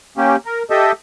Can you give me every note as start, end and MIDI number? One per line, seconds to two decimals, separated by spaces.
0.17 0.36 58
0.17 0.36 61
0.17 0.36 67
0.46 0.63 70
0.70 0.92 67
0.70 0.92 69
0.70 0.92 75
0.70 0.92 76